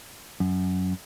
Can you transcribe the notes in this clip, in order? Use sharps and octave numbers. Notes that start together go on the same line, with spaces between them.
F#2